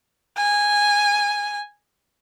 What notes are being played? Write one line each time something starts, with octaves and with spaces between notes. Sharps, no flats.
G#5